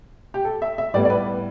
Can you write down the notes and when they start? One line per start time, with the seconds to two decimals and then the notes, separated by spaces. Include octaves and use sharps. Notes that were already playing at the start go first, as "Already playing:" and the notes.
0.34 G4
0.45 A4
0.62 E5
0.78 E5
0.94 A2 G3 B3 D5
1.05 D5
1.10 B4